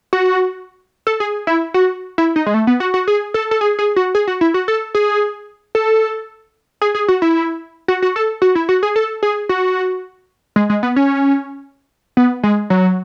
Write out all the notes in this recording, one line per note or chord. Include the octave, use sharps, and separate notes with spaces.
F#4
A4
G#4
E4
F#4
E4
D#4
G#3
A3
B3
F#4
F#4
G#4
A4
A4
G#4
G#4
F#4
G#4
F#4
E4
F#4
A4
G#4
A4
G#4
G#4
F#4
E4
F#4
F#4
A4
F#4
E4
F#4
G#4
A4
G#4
F#4
G#3
G#3
B3
C#4
B3
G#3
F#3